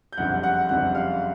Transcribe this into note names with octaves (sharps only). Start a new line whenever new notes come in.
G6
F#1 F2 D3 G3 F#5 F#6
F#5 F#6
F#1 F2 D3 G3 F#5 F#6
F5 F6